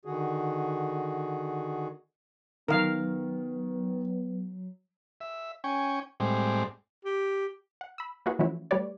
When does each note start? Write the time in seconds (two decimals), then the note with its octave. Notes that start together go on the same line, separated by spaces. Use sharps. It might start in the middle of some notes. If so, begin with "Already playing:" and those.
0.05 D3 D#3 F#4 G#4
2.68 D#3 F#3 B3 A#4 F5
5.21 E5
5.64 C#4 G5 G#5 C#6
6.20 A2 G3 G#3 C4
7.05 G4
7.81 F#5
7.98 B5 E6
8.26 A#3 E4 F#4 G#4 B4
8.39 E3 F3 A3 C#4 E4 F#4
8.71 G3 A3 G4 B4 C#5 D5